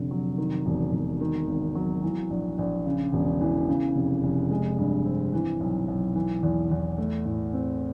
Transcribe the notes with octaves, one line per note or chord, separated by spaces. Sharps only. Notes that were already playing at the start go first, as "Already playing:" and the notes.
Already playing: F1 D3
F#3
D#3
E1
E1
D#3
G#1
F#3
E3
A#1
A#1
C#3
E1
E3
C#3
F1
F1
G#3
G2
C4
E3
B1
B1
E3
E2
E2
A3
A2
C4